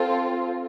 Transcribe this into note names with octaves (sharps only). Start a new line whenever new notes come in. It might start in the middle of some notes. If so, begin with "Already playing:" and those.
Already playing: C4 F4 A4